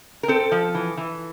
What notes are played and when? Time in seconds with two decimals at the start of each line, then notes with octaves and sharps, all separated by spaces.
0.23 A#4
0.28 C4 A4
0.52 F3
0.75 E3
0.98 E3